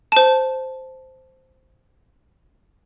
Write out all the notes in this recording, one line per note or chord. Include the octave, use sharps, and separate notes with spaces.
C5 A5